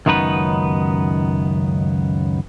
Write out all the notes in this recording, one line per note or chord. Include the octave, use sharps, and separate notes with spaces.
C#2 F#2 D#3 B3 D#4 B4